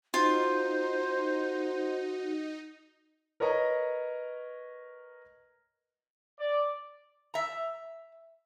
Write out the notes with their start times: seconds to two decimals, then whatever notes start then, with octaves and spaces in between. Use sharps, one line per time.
0.14 D#4 F4 F#4 C5
3.40 A#4 B4 C#5 D#5 A#5
6.39 D5
7.34 E5 A#5